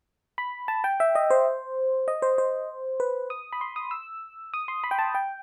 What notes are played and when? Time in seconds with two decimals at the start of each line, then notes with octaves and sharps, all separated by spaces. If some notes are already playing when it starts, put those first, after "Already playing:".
0.38 B5
0.68 A5
0.84 G5
1.00 E5
1.15 D#5
1.31 C5
2.08 D#5
2.22 C5
2.38 C5
3.00 B4
3.30 D#6
3.53 B5
3.61 C6
3.76 D#6
3.91 E6
4.54 D#6
4.68 C6
4.84 B5
4.91 G5
4.99 A5
5.15 G5